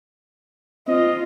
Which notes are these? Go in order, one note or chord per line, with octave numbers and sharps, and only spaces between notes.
C4 F4 D#5